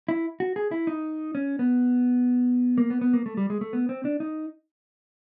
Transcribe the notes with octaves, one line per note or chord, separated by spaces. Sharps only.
E4
F#4
G#4
E4
D#4
C#4
B3
A#3
B3
B3
A#3
A3
G3
G#3
A3
B3
C4
D4
D#4